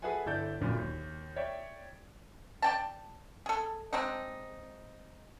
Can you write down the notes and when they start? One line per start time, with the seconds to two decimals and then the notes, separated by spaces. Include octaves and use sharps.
0.02 G#4 A4 B4 E5 F#5 G#5
0.26 G1 E4 A4 D5 G6
0.61 F#1 B1 F#2 A#2 D3
0.78 D#2
1.36 C#5 D5 E5 G5
2.62 D5 G5 A5
3.46 G#4 A4
3.93 G#3 C4 D4 D#4